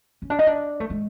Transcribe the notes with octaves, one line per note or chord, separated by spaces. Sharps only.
C#4
D4
D#4
D4
A3
G#3